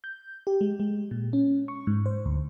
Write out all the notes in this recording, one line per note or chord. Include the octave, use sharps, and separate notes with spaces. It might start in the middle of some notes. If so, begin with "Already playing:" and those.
G6
G4
G#3
G#3
A#2
C#4
C#6
G#2
C5
D2